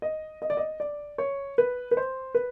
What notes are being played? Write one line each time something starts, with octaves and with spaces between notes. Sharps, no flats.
D#5
D#5
D5
D#5
D5
C#5
B4
B4
C5
B4